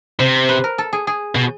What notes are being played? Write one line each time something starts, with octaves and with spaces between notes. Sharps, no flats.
C3 C5
C5
B4
A#4
A4
G#4
G#4
B2